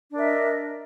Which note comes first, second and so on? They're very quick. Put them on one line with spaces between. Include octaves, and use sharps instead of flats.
D4 A#4 E5 D#5